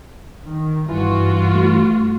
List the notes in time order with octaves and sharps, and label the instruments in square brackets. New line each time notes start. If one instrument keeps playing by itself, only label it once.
[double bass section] D#3
[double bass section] G2 [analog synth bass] E3 [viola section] F4 F#4
[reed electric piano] A3